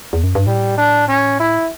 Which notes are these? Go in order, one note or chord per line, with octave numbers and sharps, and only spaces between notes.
E2
F#2
G2
A2 G3
D4
C#4
E4